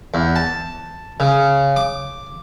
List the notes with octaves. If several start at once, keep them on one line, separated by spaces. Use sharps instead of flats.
E2
A5
C#3
D6